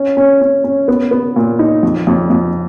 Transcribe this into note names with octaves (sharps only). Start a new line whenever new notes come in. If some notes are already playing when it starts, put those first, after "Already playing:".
Already playing: C#4
C#4
C#4
C#4
B3
B3
A#2
D#4
F2
F2
F2